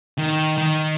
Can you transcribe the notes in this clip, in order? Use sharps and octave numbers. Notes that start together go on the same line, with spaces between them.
D#3
D#3